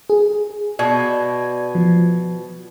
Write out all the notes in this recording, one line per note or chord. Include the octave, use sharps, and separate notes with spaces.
G#4
B2 D5 G#6
F3